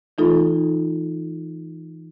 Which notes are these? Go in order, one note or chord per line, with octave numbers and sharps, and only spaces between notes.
E3 A3 D#4 F4 A4